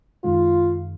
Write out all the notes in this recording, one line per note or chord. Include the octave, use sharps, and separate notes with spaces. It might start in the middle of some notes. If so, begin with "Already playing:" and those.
F#2 D#3 G#3 F4